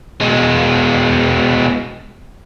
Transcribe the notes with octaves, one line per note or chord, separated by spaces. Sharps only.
B2 G#3